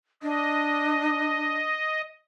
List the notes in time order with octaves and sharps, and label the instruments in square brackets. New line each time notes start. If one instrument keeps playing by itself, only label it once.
[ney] D4 [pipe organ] D#5